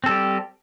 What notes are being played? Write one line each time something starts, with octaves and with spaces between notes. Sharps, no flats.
G3 C4 G4 A4